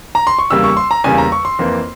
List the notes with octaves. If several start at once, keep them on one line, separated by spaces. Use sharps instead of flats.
A#5
C6
C#6
E2 C#3 G3 A#3 E6
C#6
C6
A#5
E2 C#3 G3 A#3 G#5
A#5
C#6
C6
F2 E3 A#3